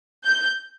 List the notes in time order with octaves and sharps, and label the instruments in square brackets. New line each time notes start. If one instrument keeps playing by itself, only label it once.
[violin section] G6